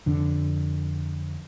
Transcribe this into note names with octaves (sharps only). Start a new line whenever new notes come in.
F2 D3